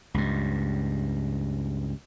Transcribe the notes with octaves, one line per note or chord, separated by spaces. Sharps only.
C#2 G2